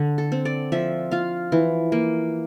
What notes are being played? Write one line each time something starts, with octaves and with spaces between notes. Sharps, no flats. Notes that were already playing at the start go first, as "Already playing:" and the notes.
Already playing: D3
A4
C4
D5
F3 E5
F4 F5
E3
A#3